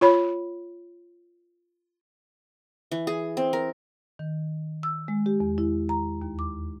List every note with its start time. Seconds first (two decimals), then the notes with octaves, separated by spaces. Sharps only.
0.01 F4 C#5 B5
2.92 E3
3.07 G#4
3.37 C4
3.53 A#4
4.19 D#3
4.83 E6
5.08 G#3
5.26 G4
5.40 E2
5.58 E4
5.89 A#5
6.22 D#2
6.39 D6